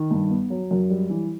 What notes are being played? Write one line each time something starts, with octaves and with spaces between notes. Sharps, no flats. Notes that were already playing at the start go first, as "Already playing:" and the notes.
Already playing: D#3
G2
B3
F#3
F#2
G3
E3